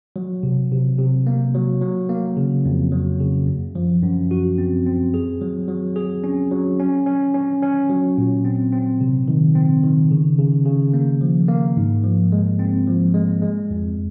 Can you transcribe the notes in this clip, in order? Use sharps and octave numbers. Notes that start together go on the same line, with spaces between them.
F#3
C3
C3
C3
A#3
F#3
F#3
A#3
C#3
F2
F#3
C#3
F#2
F3
F#2
F#4
C4
C4
G#4
F#3
F#3
G#4
C#4
F#3
C#4
C#4
C#4
C#4
F#3
A#2
C4
C4
C3
D#3
C4
D#3
C#3
C#3
C#3
A#3
F3
A#3
G#2
F3
G#3
C4
F3
G#3
G#3
F2